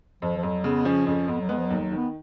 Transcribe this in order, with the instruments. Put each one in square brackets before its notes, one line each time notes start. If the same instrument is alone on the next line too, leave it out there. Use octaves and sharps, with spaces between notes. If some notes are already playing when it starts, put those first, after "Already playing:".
[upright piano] F2 [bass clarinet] F3
[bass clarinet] F3
[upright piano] F2 [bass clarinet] F#3
[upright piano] C#3 [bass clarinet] B3
[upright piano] F3 [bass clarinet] C#4
[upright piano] F2 [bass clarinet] C#4
[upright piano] F2 [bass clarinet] B3
[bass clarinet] F#3
[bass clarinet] G#3 [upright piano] B3
[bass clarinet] F3
F#3
[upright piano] D#2
[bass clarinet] F#3
[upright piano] D#3 [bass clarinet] B3